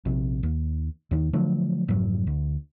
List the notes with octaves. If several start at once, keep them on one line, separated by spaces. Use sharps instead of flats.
A#1 C3
D#2
D#2 D#3
D3 F3 F#3 A3
F1 G#2 F#3
D2